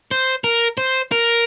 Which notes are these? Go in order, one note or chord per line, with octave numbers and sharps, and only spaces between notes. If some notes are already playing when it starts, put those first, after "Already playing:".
C5
A#4
C5
A#4